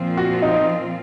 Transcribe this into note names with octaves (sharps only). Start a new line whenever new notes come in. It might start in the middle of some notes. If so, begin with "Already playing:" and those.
Already playing: A#2 F3 C4 F4
F#4
D#4